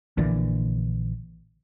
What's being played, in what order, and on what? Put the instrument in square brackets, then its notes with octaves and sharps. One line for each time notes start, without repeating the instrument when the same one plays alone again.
[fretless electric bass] A#1 A#2 D3 E3